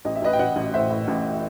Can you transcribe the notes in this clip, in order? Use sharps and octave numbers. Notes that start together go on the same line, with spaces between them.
A1 D#5
E5
A1 B4 D#5
G5
A1 D#5 F#5
A1
A2 C5 E5
A2
A1